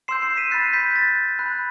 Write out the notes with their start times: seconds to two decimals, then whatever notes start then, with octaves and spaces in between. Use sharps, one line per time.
0.08 C6 E6 G6 C7 E7
0.22 C7 E7
0.37 B6 D#7
0.51 B5 F#6 A6 C7
0.73 G6 B6
0.95 C6 F#6 A6
1.39 B5 F#6